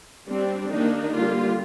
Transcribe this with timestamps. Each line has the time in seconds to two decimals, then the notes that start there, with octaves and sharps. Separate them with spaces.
0.28 G3 C4 D4
0.70 D#3 A#3 D4 D#4
1.14 D3 G3 A#3 F4